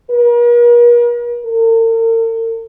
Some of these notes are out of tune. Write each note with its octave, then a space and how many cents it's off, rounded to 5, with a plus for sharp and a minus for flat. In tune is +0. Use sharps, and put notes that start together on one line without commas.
A#4 +45
A#4 -45